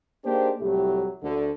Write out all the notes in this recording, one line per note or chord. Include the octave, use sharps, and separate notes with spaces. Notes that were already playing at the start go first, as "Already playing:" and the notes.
A#3 D4 D#4 G4 G#4 C5
C2 A2 F#3 A3 G4
D2 D3